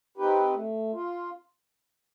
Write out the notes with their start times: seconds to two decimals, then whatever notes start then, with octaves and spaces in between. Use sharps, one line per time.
0.17 C4 D#4 G4 B4
0.54 A3
0.93 F4